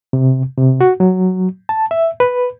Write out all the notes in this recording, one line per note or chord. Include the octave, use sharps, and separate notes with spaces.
C3
C3
F#4
F#3
A5
E5
B4